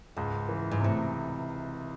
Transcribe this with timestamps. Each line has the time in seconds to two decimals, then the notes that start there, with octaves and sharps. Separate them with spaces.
0.17 C#2 G#2
0.49 E3
0.71 G#2
0.81 A2 C3